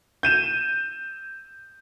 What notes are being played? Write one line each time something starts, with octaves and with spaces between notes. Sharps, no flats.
G6 D#7 E7